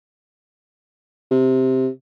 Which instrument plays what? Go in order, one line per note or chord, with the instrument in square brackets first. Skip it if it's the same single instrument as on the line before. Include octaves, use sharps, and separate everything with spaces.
[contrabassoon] C3